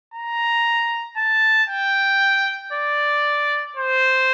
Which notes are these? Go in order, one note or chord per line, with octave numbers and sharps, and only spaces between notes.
A#5
A5
G5
D5
C5